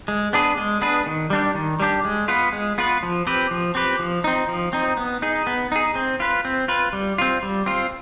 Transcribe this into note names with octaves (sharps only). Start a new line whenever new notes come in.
G#3
B3 D4 G#4 B4
G#3
B3 D4 G#4 B4
D#3
G3 D4 G4
D#3
G3 D4 G4
G#3
B3 F4 B4
G#3
B3 F4 B4
F3
C4 G4 B4
F3
C4 G4 B4
F3
C4 D#4
F3
C4 D#4
B3
D#4 G#4
B3
D#4 G#4
C4
F4 B4
C4
F4 B4
G3
C4 F4
G3
C4 F4